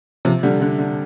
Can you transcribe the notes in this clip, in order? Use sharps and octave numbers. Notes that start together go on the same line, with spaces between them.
C3 F3
D3 G3
D3
D3